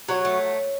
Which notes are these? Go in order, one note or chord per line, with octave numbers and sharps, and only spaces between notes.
F#3 C#5
A3